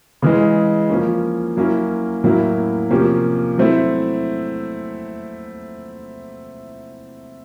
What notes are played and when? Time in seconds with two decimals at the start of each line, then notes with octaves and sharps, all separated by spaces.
0.22 C#3 E3 G#3
0.90 F3 A#3 C#4
1.57 F#3 A#3 C#4 E4
2.24 A2 F#3 A#3 C#4 E4
2.90 C3 F3 A#3 C#4
3.58 F#3 A3 C4 E4